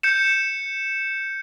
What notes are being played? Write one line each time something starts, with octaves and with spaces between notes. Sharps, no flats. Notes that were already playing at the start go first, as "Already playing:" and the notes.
G6 C#7 E7